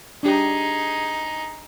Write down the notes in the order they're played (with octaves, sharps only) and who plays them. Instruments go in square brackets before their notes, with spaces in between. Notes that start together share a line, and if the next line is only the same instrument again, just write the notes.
[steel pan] D4 G4 [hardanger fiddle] D#4 G#4